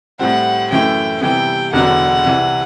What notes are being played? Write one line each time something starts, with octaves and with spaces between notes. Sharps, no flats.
A2 G3 C4 F#5
F#2 E3 A3 G5
C3 E3 G3 B3 G5
E1 E2 D3 F#3 B3 F#5
C2 C3 E3